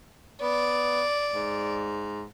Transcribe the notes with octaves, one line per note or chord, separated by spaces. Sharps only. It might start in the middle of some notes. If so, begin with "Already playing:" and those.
B3 D5
G#2